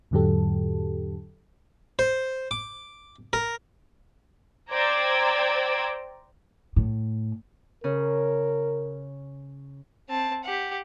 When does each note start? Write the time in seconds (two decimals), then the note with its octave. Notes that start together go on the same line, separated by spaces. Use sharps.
0.11 E2 G#2 D3 F#3 G4 A4
1.99 C5
2.51 D6
3.33 A#4
4.72 C5 D5 G5 A#5 E6 G#6
6.76 A2
7.84 C#3 A#4
10.09 C4 A5
10.44 G4 F#5